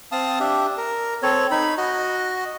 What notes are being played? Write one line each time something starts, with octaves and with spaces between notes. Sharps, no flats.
C4 F5 A5 D#6
D4 G4 E5
A#4
C4 A4 C#5
D#4 B5
F#4 D#5